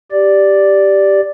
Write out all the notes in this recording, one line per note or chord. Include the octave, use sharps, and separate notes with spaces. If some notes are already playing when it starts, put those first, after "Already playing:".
G4 D5